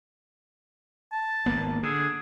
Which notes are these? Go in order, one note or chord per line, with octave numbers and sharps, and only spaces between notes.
A5
G#1 A#3 B3
D3 G#4